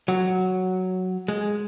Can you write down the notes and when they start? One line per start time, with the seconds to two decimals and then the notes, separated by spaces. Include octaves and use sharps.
0.08 F#3
1.28 G#3